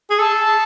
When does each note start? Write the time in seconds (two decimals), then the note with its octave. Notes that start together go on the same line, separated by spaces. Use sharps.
0.10 G#4
0.19 A4 A5